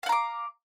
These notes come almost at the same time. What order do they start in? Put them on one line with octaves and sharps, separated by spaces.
F5 F#5 A#5 D6